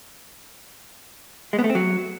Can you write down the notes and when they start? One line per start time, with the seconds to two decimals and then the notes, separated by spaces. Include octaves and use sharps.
1.53 G#3
1.59 B3
1.64 A3
1.70 C4
1.75 F#3